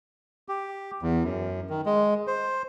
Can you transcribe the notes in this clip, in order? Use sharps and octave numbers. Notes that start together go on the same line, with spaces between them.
G4
E2
F#2
D#3
G#3
C5